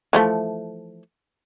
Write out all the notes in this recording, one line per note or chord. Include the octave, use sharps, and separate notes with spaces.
E3 F3 A3